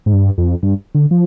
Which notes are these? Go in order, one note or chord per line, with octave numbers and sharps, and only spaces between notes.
G#2
G2
F2
G2
D3
F3